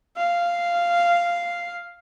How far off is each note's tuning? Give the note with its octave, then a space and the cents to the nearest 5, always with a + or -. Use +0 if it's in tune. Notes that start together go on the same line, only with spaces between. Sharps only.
F5 -5